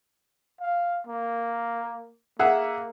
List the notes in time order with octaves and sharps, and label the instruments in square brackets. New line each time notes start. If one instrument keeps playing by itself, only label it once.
[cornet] F5
A#3
[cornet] A#3 [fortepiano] G#4 E5 F#5